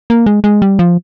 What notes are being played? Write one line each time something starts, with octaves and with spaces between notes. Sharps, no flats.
A#3
G#3
G#3
G3
F3